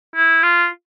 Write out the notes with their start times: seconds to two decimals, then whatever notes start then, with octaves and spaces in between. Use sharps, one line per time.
0.16 E4
0.43 F4